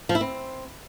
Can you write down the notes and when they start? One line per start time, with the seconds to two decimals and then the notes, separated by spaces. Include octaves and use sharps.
0.09 F3
0.15 E4
0.21 C4